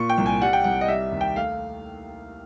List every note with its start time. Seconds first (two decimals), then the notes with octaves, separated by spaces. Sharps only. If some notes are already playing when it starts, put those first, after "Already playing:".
Already playing: A#2 C#6
0.09 G5
0.18 C2
0.26 G#5
0.42 G3 F#5
0.53 G5
0.64 C2 F#5
0.81 D#5
0.88 G3 E5
1.12 D#2
1.21 G5
1.36 A3 F5